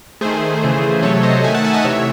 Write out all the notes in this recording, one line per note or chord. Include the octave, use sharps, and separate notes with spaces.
D#3 A3 G#4 C5
C#3 E3 A3
C3 F#3 A3 A4 C#5
C5 D#5
D#3 A3 E5 G#5
F#5 A5
E5 G#5
D#5 F#5
C3 E3 A3 C#5 E5